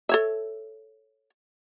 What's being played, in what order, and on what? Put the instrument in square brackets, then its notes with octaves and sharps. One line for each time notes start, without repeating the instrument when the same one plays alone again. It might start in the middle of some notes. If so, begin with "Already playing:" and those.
[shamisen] A4 C#5 E5